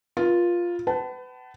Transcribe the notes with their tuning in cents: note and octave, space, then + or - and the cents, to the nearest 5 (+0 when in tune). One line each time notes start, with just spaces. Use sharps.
F4 +0 B4 -45
B4 +30 F#5 +45 A5 +0